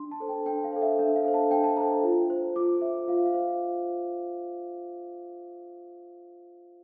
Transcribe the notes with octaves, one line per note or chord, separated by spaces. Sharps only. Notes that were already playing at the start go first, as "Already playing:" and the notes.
Already playing: D4 C6
A5
A4 C5
G5
D4 G5
F5
A4 C5
E5
D4 E5
F5
A4 C5
A5
D4 G5
A5
A4 C5 A#5
F4
C5
F4 D6
C5 E5
F4 F5
F5
C5